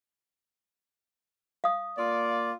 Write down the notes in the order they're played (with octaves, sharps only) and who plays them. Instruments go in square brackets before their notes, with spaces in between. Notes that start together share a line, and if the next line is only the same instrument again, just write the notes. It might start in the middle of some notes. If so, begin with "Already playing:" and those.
[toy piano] F5 D#6
[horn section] A#3 F4 D5